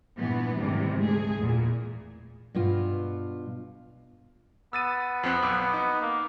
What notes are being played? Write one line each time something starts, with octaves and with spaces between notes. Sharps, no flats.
G2 A#2 E3 B3
D2 G#2 C3 D#3 E3 G3
G#3 A3 G#4
E2 A#2
G2 B2 F4
B3 E6 A6 D#7
F2 C4 F#6
B1 D6 E6
D#4
A#3